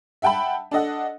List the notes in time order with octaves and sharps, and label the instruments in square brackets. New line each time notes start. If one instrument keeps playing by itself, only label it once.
[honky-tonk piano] E5 F#5 G5 A5 B5
D4 A4 D#5 F#5